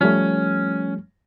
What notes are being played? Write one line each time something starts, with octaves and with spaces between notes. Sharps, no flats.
F3 G3 A3 C#4